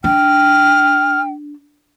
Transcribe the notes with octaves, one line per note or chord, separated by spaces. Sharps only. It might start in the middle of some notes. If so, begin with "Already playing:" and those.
D4 G5 F6